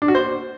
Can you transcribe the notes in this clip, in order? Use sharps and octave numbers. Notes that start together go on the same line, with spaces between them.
D4
F#4
C5